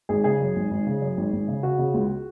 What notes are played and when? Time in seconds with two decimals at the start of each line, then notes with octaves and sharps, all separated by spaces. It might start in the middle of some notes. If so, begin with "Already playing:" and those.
0.09 G#1 G#4
0.24 C#3 G#4
0.40 F#2
0.56 G#1
0.71 G#1
0.87 C#3
1.01 F#2
1.17 G#1
1.33 G#1
1.48 C#3
1.63 C#3 F#4
1.79 C#3
1.94 C#2